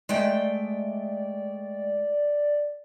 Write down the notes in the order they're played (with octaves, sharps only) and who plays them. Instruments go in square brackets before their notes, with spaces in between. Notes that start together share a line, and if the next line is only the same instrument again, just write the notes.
[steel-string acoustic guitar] G#3 A3 G5 [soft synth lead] D5